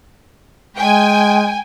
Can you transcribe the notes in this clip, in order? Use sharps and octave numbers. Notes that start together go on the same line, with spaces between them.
G#3 G5 G#5